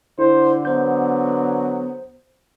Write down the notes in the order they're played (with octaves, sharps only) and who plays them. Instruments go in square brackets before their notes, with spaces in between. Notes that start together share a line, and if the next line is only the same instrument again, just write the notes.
[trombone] D3 [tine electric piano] E4 [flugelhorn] C5
[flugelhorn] F#3 [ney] B3 [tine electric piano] C5 G6